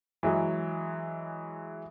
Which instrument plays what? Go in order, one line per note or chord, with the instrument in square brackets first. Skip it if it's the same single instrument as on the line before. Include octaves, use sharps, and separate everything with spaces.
[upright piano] E3 F#3 G#3